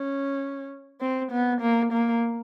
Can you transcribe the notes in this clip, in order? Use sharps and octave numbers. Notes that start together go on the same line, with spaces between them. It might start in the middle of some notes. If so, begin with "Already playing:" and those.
Already playing: C#4
C4
B3
A#3
A#3